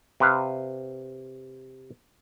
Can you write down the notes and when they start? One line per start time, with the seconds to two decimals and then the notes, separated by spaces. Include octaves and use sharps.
0.20 C3 B4 F5